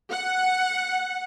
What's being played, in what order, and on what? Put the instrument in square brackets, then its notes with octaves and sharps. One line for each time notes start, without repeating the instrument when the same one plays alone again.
[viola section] F#5